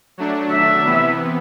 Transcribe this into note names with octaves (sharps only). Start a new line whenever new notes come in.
F#3 A3 D4
E5
C3 E3 B3